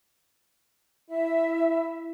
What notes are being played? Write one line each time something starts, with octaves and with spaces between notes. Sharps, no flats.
E4 E5